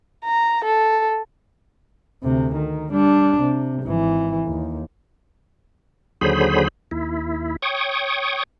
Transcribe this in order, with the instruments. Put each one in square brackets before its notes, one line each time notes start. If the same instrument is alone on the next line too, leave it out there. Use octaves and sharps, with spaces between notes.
[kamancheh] A#5
A4
[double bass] D2 C3
D#3
G3 D4
C3
G#1 E3
D#2
[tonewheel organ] D#2 D3 F#3 G#4 C5 B5
D#2 E4
C#5 G5 C#6 D#6